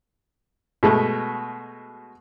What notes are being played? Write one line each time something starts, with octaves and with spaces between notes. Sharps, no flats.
B2 G#3 A3